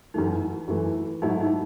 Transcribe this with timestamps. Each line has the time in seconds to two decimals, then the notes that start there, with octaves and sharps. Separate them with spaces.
0.14 F#2 E3 A3 D#4
0.68 F#2 E3 A3
1.22 G#2 F#3 A3 D#4 E4 A4
1.40 D#4